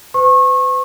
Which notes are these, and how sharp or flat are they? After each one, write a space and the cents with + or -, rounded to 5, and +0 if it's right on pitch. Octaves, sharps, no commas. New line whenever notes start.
B4 +45 C#6 -30